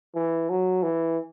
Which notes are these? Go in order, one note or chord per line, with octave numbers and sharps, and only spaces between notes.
E3
F#3
E3